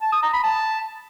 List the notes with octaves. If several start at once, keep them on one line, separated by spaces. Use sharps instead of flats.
A5
D#6
A#5
B5
A5